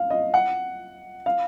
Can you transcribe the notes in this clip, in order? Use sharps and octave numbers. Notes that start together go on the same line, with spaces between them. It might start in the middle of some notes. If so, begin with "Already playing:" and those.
Already playing: F5
D#5
F#5
F5